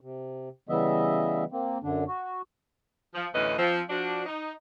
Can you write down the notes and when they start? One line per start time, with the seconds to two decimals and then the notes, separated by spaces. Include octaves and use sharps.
0.01 C3
0.69 C#3 E3 G3 B3 D#5 E5
1.52 A#3 C4
1.83 F#2 D3 D4
2.08 F#4
3.15 F3
3.34 D2 A2 E3 C#4 B4 D#5
3.58 F3 C4
3.90 F3 D4 F#4
4.26 D#4